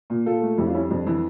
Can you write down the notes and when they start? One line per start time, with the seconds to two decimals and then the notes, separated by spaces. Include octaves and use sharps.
0.10 A#2
0.26 A#2 F4 A4
0.42 A3
0.58 F2 E4 G4
0.66 D4 F4
0.74 G3 C#4 E4
0.91 F2 D4
1.07 E3